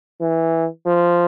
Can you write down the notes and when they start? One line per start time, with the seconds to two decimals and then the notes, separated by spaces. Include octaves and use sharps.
0.21 E3
0.86 F3